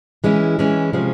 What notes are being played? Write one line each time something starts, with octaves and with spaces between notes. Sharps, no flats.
E3 G#3 C#4 E4
E3 G#3 C#4 E4
C3 F3 G#3 C#4